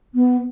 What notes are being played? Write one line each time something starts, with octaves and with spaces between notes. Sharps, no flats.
B3